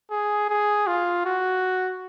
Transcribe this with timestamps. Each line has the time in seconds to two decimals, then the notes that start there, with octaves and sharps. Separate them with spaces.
0.10 G#4
0.49 G#4
0.87 F4
1.25 F#4